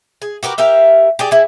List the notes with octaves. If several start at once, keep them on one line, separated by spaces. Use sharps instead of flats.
G#4
F#4 G4 A#4 B4
G4 A#4 E5 F5
G4 G#4 D5
E4 G#4